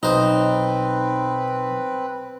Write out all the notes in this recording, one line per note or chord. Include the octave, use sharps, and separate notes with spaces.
B1 C4 D#4 B4 C5